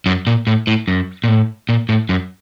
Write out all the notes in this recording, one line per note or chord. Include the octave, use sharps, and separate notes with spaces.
F#2
A#2
A2
A2
F#2
A#2
A2
A#2
A2
F#2